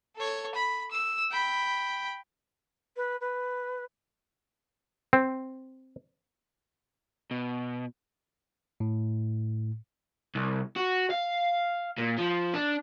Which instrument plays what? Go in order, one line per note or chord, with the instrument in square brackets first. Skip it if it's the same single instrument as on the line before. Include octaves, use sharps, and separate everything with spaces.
[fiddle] A4 C#5
B5
E6
G5 B5
[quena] B4
B4
[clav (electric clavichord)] C4
[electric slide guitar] B2
[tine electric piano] A2
[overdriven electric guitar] C2
F#4
F5
A#2
F3
D4